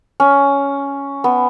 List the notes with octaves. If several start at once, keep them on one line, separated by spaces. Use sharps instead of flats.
C#4
B3